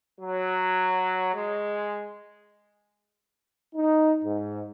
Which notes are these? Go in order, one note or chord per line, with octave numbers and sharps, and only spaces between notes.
F#3
G#3
D#4
G#2